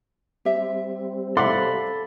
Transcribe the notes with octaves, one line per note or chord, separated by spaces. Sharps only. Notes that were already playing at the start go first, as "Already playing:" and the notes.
G3 C4 G4 E5
E4 A4 D5 F5 F#5 B5 C6 D6